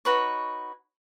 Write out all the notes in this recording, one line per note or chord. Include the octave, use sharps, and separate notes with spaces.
D#4 F#4 B4 C#5